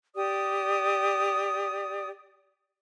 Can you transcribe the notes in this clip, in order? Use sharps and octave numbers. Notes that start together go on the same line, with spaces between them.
G4 D5 D#6